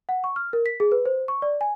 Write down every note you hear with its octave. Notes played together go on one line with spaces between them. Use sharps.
F#5
C#6
F6
A#4
B6
G#4
B4
C5
C#6
D5
G#5